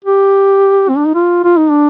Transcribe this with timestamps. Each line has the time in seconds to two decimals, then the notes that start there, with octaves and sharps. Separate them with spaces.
0.04 G4
0.89 C4
0.97 D4
1.06 D#4
1.15 F4
1.44 F4
1.57 D#4
1.70 D4